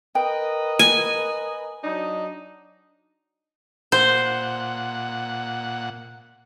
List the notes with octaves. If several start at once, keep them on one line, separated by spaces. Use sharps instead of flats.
A#4 B4 D#5 G5
G#5
F#3 D4 D#4
A#2 C5 F#5